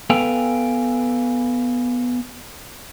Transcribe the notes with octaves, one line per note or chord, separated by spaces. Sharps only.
B3 A4 B4 F5 G5 G#5